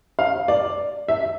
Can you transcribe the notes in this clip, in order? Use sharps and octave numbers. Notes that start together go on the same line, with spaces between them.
F5
D5
E5